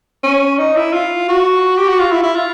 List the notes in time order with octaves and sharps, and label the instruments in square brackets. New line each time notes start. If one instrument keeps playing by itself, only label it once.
[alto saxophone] C#4
D#4
E4
F4
F#4
G4
F#4
F4
E4
E4
F4